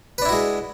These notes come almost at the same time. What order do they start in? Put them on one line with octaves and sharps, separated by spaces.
B4 D4 E4 F#4 G#3